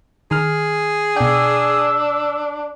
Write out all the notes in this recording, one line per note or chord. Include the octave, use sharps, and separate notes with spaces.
D#3 G#4 F6
B2 D4 G5 E6